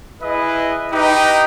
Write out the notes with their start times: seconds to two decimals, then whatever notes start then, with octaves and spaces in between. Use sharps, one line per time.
0.21 E4 G#4 B4 D#5
0.91 D#4 G4 B4 D#5 G5